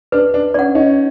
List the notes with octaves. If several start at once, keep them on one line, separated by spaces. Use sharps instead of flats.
D4 B4
D4
C#4 D5 F#5
C#4 D#4